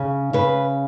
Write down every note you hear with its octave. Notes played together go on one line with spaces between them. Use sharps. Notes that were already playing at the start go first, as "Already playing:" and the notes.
Already playing: C#3
C#3 B4